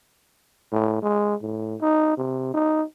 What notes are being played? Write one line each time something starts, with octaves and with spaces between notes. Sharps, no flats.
A2
G#3
A2
D#4
C3
D#4